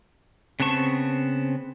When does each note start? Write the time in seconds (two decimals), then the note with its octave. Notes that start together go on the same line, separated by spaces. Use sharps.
0.60 C#3 B3 C4 A5 C#6